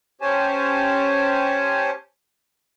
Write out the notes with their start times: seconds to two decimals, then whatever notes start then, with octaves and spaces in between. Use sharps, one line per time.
0.21 C#4 G4 C5 C#5 G#5 A5